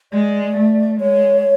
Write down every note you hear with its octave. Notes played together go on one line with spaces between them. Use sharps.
G#3 D5
A3
G#3 C#5